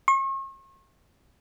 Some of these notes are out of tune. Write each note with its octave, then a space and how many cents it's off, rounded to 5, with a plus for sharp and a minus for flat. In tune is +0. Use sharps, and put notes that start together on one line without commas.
C#6 -45